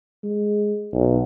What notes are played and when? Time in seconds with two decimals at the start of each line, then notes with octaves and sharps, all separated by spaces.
0.24 G#3
0.93 B1